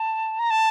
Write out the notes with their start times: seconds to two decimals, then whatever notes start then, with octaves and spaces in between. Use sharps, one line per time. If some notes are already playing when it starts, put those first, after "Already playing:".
Already playing: A5
0.39 A#5
0.50 A5